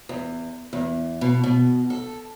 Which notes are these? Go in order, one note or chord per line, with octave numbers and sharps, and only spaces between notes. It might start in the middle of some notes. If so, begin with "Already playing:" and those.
E2
E2
B2
B2
A4